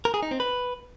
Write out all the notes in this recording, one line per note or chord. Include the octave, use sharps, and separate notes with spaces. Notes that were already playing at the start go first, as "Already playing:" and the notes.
A#4
G#4
D#4
C4
B4